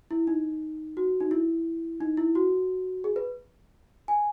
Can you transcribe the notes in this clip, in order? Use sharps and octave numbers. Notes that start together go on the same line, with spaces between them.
E4
D#4
F#4
D#4
E4
D#4
E4
F#4
G#4
B4
G#5